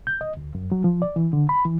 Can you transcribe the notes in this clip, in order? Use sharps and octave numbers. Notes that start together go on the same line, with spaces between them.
G6
D#5
D2
F#2
F#3
F3
D5
E3
D3
B5
E3